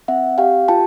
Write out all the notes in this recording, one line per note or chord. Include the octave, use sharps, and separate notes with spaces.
C4 E5 F#5
G4 F5 G5
F4 G5 A5